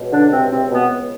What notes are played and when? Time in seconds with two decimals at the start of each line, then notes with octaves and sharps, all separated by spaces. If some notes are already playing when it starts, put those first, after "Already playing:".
Already playing: C#2 B2
0.11 D3 D4
0.31 C3 C4
0.51 C3 C4
0.71 B2 B3